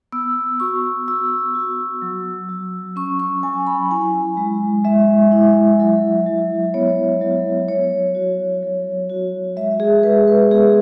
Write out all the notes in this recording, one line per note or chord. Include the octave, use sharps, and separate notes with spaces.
B3 E6
F#4 C#6
F#4 E6
F#4
F#3
F#3
C#4 C#6
C#6
F#3 G#5
B5
E4 G#5
G#3
G#3 E5
E4
F#3
F#3
B3 C#5
F#3
F#3 C#5
F#4
F#3
F#4
G#3 E5
G#4
G#3 B4
B4
B3 G#4